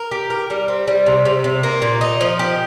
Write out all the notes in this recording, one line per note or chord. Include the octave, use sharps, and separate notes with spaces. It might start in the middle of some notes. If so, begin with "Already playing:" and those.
Already playing: A#4
G4
A#4
G3
C4
G3
C3
C3
C3
A#3
A#2
D#4
F3
G4